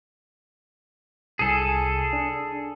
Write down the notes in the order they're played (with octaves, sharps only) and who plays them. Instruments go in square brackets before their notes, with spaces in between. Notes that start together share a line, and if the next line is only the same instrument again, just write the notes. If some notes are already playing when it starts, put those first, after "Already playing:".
[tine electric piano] C2 G#5 [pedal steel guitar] G#4 A4
[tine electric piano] D4